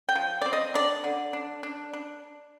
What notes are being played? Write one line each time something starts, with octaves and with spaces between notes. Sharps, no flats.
G5
F3
C4 D5
D#5
D4 D5
D3
D4
D4
D4